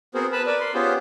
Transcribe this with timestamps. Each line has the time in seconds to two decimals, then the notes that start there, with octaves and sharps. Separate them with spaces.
0.14 B3 C4 F#4 G#4 A#4 C5
0.32 B4 A5 B5
0.46 A#4 B4 D5
0.60 B5 C6
0.74 B3 C#4 F4 G4 G#4 C5